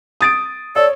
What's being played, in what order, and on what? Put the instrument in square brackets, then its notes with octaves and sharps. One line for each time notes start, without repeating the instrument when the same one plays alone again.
[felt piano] D#6 A6 D7
[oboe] A4 [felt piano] C#5 [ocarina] D5